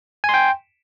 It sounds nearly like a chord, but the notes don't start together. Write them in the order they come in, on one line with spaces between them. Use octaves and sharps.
G#5 C6 G5